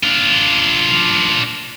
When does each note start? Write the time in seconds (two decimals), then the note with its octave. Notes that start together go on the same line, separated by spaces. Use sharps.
0.03 D4 F4